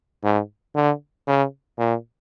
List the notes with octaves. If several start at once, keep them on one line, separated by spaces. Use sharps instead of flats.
G#2
D3
C#3
A#2